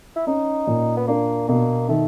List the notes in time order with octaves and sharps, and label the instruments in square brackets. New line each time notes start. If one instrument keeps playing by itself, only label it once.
[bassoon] E4
[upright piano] C#4 [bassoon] D#4
[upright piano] A#2
[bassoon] B3
[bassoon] A#3 [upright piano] D4
[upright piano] B2 [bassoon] A#3
[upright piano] D#3 [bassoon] A3